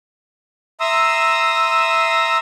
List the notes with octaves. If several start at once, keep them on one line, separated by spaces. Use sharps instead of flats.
E5 A#5 C6 D#6 E6